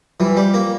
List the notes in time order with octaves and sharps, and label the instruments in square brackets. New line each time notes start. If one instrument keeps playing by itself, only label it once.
[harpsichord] E3 [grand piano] F3 G3
[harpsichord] G3
A#3